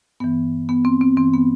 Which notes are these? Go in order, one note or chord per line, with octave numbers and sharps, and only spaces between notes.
G2 E3 B3
B3
C4
C4
G2 E3 C4
B3